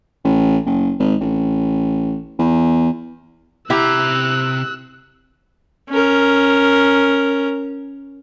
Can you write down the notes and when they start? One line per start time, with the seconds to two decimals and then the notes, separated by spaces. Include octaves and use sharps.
0.24 A1
0.66 F#1
0.99 G#1
1.21 A1
2.39 E2
3.70 C3 E4 G4 A#5 E6 F#6
5.90 C#4 A#4